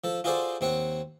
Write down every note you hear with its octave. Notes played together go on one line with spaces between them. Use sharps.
F3 A4
F4 F#4 G#4 A4 C5 D5
D#2 C4 C#5 F#5